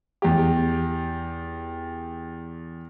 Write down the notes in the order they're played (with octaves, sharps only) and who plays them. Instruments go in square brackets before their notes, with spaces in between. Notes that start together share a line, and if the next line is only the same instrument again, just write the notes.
[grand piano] E2 G4